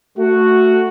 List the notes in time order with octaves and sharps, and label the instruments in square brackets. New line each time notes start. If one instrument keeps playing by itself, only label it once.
[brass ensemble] A3 F#4